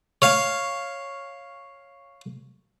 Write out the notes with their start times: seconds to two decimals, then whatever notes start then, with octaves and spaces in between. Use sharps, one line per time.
0.22 C#5 F5